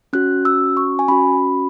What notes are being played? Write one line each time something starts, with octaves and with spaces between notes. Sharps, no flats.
C#4 F#4 F#6
E6
C#6
G#5
C#4 F#4 B5